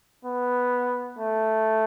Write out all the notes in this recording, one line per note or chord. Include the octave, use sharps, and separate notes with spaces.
B3
A3